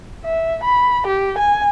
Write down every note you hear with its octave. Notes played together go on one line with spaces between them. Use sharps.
E5
B5
G4
G#5